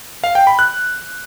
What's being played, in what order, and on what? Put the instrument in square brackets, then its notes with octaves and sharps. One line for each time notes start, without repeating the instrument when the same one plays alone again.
[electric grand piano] F5
G5
B5
F#6